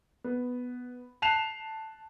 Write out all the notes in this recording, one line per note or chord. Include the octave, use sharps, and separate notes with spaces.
B3
A5 F#6 C7 E7 F7